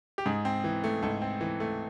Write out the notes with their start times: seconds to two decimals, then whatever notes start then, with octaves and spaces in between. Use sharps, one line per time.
0.18 G4
0.26 G#2 G#4
0.45 C4
0.64 E3
0.84 A3
1.02 G#2 A4
1.22 C4
1.41 E3
1.60 A3